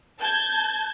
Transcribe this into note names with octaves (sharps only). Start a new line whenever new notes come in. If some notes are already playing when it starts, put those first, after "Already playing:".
A5 G6 G#6